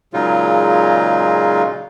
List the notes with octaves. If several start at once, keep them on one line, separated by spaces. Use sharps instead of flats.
A#2 C#3 F#3 G#3 D#4 F4